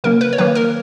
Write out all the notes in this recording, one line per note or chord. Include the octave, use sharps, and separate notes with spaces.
C#3 F#3 A#3 A#4
B4
C#5
D#3 F#3 A#3 B4
A#4